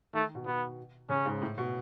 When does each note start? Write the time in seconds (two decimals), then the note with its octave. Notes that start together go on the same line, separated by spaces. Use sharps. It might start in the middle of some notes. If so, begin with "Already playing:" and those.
0.13 D#3 A3
0.35 B2
0.46 B2 B3
1.09 C#3 C#4
1.26 G#2
1.41 A2
1.58 B2